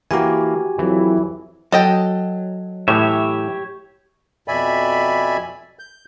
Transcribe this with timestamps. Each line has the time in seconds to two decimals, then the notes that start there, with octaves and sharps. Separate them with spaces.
0.11 E3 A#3 F#4 G4 G#5
0.79 F2 E3 F#3 E4
1.72 F#3 A4 D#5 G5
2.88 A2 E3 G4 C#5 E5
4.48 F2 B2 D5 E5 G#5 B5
5.79 G6